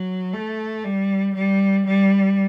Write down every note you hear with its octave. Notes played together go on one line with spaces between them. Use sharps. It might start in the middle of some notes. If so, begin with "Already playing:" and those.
Already playing: F#3
A3
G3
G3
G3